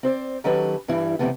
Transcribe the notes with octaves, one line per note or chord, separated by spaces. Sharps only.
C4 C5 D5
D#3 F#3 C#4 G4 A4 B4
G2 E3 G3 E4
C3 D#3 E3 G3 A3 B3